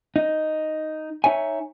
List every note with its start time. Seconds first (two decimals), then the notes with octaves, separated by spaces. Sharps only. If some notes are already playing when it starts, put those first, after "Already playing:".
0.16 D#4
1.24 D#4 C#5 E5 G#5